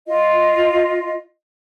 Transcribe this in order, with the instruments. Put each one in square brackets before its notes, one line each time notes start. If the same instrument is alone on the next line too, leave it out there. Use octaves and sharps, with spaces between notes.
[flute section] F4 D#5